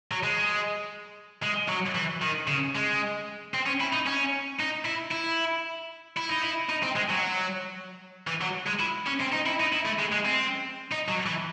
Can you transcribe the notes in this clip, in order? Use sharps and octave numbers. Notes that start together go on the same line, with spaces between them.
F#3
G#3
G#3
F#3
E3
D#3
C#3
G#3
C4
C#4
E4
D#4
C#4
D#4
E4
E4
E4
D#4
E4
D#4
C4
G#3
F#3
E3
F#3
G#3
E4
C#4
C4
D#4
E4
D#4
E4
A3
G#3
G#3
C4
D#4
F#3
E3